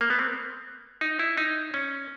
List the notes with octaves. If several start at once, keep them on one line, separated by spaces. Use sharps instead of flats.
A#3
B3
C4
D#4
E4
D#4
C#4